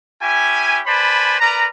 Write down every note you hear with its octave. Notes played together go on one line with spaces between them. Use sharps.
C#4 E4 G4 G#5
B4 C5 D5 G#5 A5 B5
A#4 B4 D5 A#5